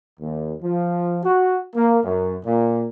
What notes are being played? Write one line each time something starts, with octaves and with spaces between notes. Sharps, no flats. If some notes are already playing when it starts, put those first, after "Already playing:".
D#2
F3
F#4
A#3
F#2
A#2